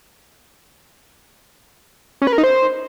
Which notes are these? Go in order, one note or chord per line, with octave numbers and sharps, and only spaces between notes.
C#4
B4
A#4
D#4
C5